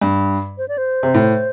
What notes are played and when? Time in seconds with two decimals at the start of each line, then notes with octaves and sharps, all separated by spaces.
0.01 G2
0.58 C5
0.68 D5
0.78 C5
1.03 C3
1.14 A2